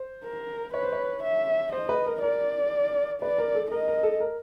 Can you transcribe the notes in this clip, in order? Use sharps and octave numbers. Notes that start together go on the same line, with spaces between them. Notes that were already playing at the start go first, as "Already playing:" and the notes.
Already playing: C5
A#4
B4 C#5
C5
C#5
E5
C5 D#5
B4
A#4
A#4 D5
B4 D5
A#4
A4
A#4 D#5
A#4
A4
A#4